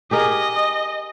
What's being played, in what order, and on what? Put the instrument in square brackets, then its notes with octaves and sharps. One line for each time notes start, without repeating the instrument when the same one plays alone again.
[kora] G4 G#4 A#4 [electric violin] D#5